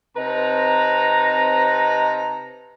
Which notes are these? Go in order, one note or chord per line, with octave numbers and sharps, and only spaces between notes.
C3 C4 D#4 B4 A5 A#5